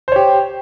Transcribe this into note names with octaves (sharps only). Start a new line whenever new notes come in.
G4 C5 C#5